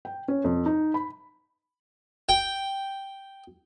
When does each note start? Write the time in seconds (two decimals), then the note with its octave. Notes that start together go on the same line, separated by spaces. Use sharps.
0.05 G5
0.28 C#4
0.44 F2
0.66 D#4
0.94 B5
2.29 G5